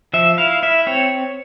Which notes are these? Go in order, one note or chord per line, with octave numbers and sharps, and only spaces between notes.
F3 E5
E4 F5
E4 E5
C4 C#5